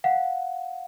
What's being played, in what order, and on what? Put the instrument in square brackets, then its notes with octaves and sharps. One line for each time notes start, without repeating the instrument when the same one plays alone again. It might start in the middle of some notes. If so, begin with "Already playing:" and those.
[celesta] F5 F#5